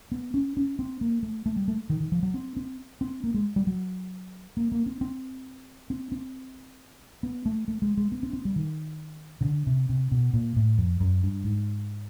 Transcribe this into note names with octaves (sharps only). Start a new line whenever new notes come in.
B3
C#4
C#4
C4
A#3
A3
A3
G3
A3
D#3
D#3
F3
F#3
C4
C4
C4
A#3
G#3
G3
F#3
A#3
A#3
C4
C4
C4
C4
B3
A3
A3
G#3
G#3
B3
C4
C4
G3
D#3
C#3
D3
C3
C3
B2
A#2
A2
F2
F#2
G2
G#2